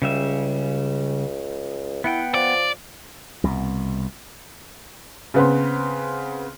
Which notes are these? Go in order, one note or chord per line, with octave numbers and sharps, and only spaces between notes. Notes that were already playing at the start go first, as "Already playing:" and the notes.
C#2 C#3 G3 E5
B3 E4 F#5 G5
F3 D5
C2 B2
C#3 B3 C4